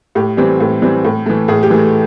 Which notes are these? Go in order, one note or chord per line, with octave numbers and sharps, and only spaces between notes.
A2 G4
E3 G3 C4 G4
A2
E3 G3 C4
A2
E3 A3
A2 G#4
G4
E3 A3